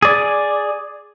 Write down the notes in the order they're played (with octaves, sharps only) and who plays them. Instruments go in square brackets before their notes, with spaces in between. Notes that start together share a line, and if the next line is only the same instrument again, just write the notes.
[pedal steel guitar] G#4 D5